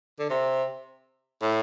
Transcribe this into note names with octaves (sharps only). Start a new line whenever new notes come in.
D3
C3
A2